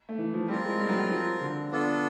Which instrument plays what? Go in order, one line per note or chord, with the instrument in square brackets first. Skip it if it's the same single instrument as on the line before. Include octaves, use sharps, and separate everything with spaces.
[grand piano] A3
E3
F3
[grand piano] G3 [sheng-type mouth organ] C4 F4 A#4
[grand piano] G#3
G3
F#3
F#3
F3
D3
[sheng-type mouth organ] B3 D4 F4 A4